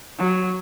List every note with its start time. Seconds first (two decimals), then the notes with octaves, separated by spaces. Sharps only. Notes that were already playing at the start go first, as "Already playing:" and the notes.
0.19 F#3